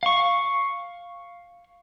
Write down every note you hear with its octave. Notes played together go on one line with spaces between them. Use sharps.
F5 C#6